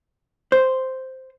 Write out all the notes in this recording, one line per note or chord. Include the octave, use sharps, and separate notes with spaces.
C5